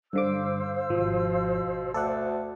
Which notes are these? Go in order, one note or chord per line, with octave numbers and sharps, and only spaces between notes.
G2 D3 C5 F5 D6 E6
G#1 B2 F3
D2 A4 D5 F#5